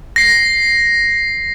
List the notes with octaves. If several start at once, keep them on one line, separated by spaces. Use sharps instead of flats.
A#6 C7